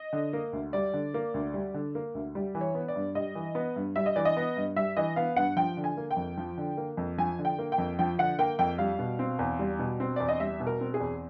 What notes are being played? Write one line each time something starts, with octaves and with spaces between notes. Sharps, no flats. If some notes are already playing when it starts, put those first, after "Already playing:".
Already playing: D#5
D3
A#3
D2
G3 D5
D3
A#3
D2
G3
D3
A#3
D2
G3
E3
C#5
B3
D5
G2
G3 D#5
E3
B3
G2
G3 E5
D#5
E3 D5
D#5
B3
G2
G3 E5
E3 D#5
B3 F5
G2 F#5
F3 G5
D3
G#5
A#3
G5
F2
F3
D3
A#3
F2
F3 G#5
D3
G5
A#3
G5
F2
F3 G5
D3 F#5
A#3 G5
F2 G5
G3 F5
B2
C4
E2
G3
B2
C4
E2 D5
D#5
G3 E5
B2
A#4
C4
G#4
E2